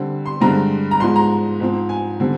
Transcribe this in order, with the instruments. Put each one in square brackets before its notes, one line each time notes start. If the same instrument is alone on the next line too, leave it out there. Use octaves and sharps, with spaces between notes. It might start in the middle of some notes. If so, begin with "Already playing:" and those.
Already playing: [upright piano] D3 G3 C4
C6
G2 D3 G#3 C4 A#5
A#5
G#2 F3 G#3 C6
A#5
G#2 F3 C4
G#5
D3 G3 C4